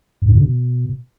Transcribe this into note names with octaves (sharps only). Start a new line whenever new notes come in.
G2
G#2
D3
B2